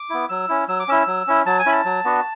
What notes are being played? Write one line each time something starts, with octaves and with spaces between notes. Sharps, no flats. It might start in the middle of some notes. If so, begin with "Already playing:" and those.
Already playing: D6
B3 E4
F#3 E6
C#4 E4
F#3 E6
D6
C#4 E4 E6
F#3
C#4 E4
F#3 A5
G#5
C#4 E4 B5
A5
F#3
B3 D4 F#4